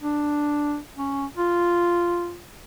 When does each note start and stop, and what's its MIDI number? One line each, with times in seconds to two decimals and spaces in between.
0.03 0.79 62
0.97 1.25 61
1.37 2.37 65